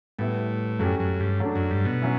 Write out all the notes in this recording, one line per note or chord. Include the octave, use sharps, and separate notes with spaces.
A2 G3 B3 E4
F#2 F#3 A3 C#4 G4
F#2
G2
F#3 A3 D4
F#2
G2
B2
F#3 C#4 E4